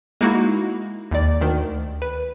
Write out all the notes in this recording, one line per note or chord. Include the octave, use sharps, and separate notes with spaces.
G#3 A#3 D#4 E4 F#4
D#2 D5
D2 D#3
B4